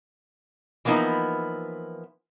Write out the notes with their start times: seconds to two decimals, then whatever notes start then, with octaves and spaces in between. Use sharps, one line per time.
0.85 E3 F3 A#3 B3 D#4 E4